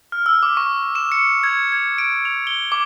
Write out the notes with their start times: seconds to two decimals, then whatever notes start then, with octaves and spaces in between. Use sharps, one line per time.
0.12 F6
0.26 E6
0.43 D6
0.57 C#6
0.95 E7
1.12 C#7
1.43 G#6
1.72 G#6
1.98 D7
2.25 F7
2.47 G7
2.72 D6